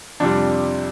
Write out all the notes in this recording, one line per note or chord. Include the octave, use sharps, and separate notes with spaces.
F2 C3 G3 D4